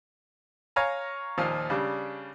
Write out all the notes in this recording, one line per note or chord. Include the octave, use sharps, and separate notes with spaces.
C#5 F5 G#5 A#5
D#2 A#2 F3 F4
C#3 G3 D4